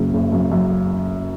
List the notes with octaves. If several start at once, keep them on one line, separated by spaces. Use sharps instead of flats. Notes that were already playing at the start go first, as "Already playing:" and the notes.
Already playing: F#1 F#2 C#3
F#1
F#2
F#2